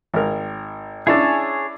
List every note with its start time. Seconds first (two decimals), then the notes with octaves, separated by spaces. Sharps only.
0.14 G#1 A#4
1.07 C#4 D4 E4 G#4 C#5 A5